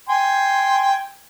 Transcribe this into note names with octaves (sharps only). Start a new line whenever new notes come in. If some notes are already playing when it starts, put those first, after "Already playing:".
G5 G#5 C6